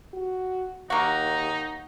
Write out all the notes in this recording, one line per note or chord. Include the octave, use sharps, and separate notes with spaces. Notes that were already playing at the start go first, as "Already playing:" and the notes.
F#4
D#2 A#3 D#4 F#4